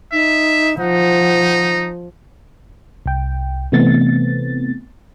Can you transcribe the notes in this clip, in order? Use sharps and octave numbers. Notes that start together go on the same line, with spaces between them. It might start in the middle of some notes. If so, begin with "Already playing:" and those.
D#4 E5
F3 D#4 F#5
C2 G5
C3 E3 A3 B3 C4 A6